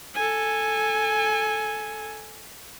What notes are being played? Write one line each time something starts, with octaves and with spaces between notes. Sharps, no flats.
A4 G#5